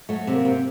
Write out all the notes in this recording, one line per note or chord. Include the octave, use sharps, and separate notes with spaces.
F#3 A3
C3
A#3
C3